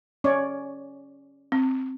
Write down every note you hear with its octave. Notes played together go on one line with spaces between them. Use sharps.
C#4 C#5 D5
C4